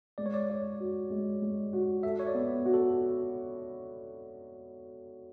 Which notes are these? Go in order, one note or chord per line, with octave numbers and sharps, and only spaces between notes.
G#3 D5
C#5
D5
C#5
F#4
G#3
G#3
F#4
A4 E5
C#5
D5
B3
F#4
A4